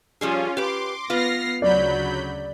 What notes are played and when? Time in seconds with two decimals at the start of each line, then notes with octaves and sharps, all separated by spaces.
0.21 F3 G3 C#4 F4 G#4
0.57 G4 B4 C6 D6
1.10 B3 F4 B4 F6 A#6 C7
1.62 D2 C#3 F#3 D5 B5 G6